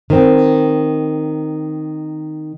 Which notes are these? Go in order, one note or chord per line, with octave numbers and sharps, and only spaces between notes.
D#3 C4